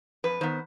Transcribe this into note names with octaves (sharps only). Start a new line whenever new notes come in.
F2 B4
D#3 B3 C5